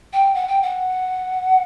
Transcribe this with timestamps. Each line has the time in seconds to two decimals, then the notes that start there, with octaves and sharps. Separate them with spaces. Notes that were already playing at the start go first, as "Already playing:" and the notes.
0.13 G5
0.34 F#5
0.47 G5
0.62 F#5